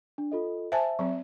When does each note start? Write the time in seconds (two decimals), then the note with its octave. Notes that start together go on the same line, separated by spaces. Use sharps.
0.18 D4
0.32 F4 A4 D#5
0.72 C5 E5 G#5 A5
0.99 F#3 C4